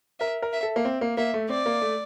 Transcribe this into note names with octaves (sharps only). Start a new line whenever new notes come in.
A#4 E5
A#4
E5
A4
A#3
C4
A#3
A#3 E5
A3
C4 D5
A#3
A3